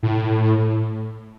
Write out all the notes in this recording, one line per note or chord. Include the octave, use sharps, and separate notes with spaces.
A2